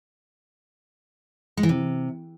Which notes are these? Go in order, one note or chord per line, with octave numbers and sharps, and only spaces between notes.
G#3
E3
C3